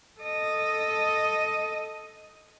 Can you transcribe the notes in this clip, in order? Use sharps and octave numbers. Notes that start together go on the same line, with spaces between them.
A4 D#5